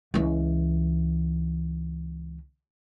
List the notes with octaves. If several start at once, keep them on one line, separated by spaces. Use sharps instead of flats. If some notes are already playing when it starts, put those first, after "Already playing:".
C#2 E3